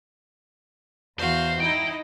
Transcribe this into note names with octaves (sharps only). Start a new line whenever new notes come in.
E2 F#4 C5 F5 C6
D#4 E4 D#5 G5